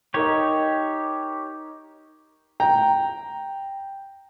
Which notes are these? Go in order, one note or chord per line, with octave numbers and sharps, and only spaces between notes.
D#4 G4 A#4 C#5 D#5
G5 A#5